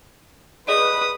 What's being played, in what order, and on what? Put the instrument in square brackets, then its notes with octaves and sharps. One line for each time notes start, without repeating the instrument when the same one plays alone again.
[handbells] G#4 D5 D#5 [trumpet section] B4 [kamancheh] D#6